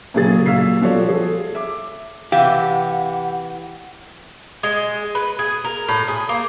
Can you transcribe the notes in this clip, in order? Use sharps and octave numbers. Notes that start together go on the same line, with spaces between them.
A#2 C#3 F#3 G4 G#4 A6
A#2 F#3 F5 E6 B6 C7
F3 G3 F#4 A4 C#5 D5
G#4 A4
E5 D6
C3 E3 G4 F5 F#5
G#3
B4
G#4
A#4
A2
G#4
A#3